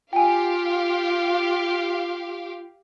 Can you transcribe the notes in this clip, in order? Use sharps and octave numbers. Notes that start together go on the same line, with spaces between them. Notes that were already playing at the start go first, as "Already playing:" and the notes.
F4 G4 F5 G5 G#5